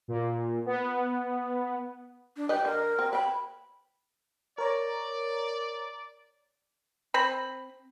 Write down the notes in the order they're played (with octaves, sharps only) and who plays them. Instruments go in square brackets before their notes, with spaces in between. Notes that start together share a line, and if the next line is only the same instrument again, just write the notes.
[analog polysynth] A#2
B3
[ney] D4
[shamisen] G3 B4 D#5 [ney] G5
[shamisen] D3 [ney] A#4
[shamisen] C4
[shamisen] B4 G5 [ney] B5
[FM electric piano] A#4 C#5 A#5 [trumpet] D5
[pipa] C4 B5